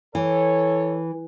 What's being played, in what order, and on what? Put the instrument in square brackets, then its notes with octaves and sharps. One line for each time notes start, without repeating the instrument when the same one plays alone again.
[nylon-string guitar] E3 [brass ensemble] A4 C#5